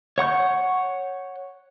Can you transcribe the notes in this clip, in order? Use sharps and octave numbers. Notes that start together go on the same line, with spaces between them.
C#5 F#5 C#6 G6